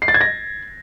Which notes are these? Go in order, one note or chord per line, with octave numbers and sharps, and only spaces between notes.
C7
A6
G#6
A#6